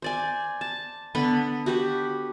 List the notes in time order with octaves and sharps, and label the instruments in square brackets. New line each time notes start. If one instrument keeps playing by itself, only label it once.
[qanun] C5 D5 G#5
A5
D3 B3 B4
F#4 G4 B4